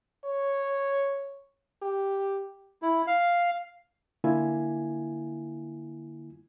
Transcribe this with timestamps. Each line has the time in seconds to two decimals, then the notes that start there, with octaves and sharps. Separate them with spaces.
0.25 C#5
1.82 G4
2.82 E4
3.07 F5
4.24 D3 A#3 E4 F4 G#5